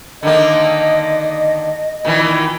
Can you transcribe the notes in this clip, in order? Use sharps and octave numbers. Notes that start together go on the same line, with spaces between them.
D3 D#3 A#3 D#5
A#2 D#3 E3